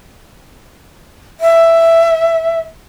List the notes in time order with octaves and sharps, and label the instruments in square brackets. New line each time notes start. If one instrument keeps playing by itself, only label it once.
[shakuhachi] E5